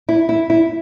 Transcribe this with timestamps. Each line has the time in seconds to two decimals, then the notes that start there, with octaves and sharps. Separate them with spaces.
0.09 E4
0.29 E4
0.50 E4